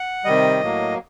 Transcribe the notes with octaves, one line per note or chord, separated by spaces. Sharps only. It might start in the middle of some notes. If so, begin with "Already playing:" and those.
Already playing: F#5
C3 D#3 G3 D#5
A2 F#3 A#3